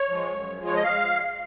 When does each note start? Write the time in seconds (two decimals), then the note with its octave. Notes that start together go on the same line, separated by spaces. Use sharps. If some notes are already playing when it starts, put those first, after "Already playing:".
Already playing: C#5
0.10 F3 G#3
0.34 F#2
0.59 F3 G#3
0.66 C#5
0.75 D#5
0.83 F5